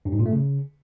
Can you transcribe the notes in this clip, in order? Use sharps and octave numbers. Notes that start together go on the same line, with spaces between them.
G2
G#2
A#2
A3
C#3